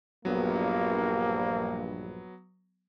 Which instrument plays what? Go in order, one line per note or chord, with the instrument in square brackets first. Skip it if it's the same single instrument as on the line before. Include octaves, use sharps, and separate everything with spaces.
[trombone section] A#1 G2 [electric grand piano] F#3 B3 [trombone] A#3